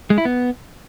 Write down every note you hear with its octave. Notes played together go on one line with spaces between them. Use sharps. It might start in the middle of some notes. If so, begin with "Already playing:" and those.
G#3
E4
B3